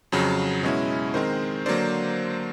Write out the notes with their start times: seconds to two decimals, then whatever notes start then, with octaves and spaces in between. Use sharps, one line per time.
0.12 F2 C#3 F#3
0.63 B2 G#3 C#4 E4
1.14 D#3 G#3 C4 A#4 C5
1.66 D3 F#3 A#3 C5 D5